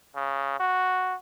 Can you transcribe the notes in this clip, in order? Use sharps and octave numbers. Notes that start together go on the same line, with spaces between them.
C#3
F#4